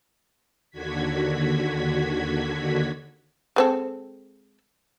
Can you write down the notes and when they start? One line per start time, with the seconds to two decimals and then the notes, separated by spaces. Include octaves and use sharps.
0.71 D#2 D3 F#4 G#6 B6
3.56 G#3 C4 A4